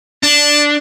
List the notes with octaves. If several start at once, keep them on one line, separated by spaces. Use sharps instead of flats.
D4 A5